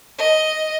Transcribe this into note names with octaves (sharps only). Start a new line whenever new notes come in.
D#5